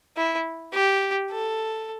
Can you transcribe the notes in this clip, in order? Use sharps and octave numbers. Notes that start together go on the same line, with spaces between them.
E4
G4
A4